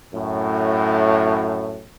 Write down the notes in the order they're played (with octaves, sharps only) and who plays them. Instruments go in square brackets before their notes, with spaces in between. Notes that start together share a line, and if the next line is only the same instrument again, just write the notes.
[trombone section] F#2 A2